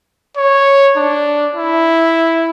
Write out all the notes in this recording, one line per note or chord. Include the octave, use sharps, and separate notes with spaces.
C#5
D4
E4